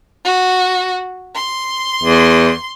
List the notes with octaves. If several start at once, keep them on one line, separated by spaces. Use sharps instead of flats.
F#4
C6
E2